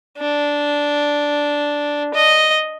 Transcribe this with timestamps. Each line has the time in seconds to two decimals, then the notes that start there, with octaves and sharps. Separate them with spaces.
0.18 D4
2.14 D#5